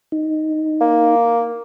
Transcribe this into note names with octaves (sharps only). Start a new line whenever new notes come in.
D#4
A#3